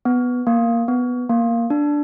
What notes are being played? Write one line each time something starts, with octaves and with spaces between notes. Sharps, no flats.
B3
A#3
B3
A#3
D4